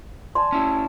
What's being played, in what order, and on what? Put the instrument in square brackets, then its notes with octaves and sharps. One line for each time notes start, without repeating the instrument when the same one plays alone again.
[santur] D5 G#5 A5 [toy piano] C6
[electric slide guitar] C#4 E4